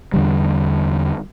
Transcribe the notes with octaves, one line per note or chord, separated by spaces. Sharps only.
E2 D3 G3